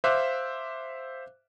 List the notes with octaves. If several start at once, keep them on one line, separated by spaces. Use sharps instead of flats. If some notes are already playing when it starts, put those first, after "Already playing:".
C5 E5 F5 D6 F#6